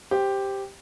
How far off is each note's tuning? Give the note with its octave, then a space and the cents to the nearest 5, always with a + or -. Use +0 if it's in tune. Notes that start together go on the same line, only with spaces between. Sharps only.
G4 +0 C5 +0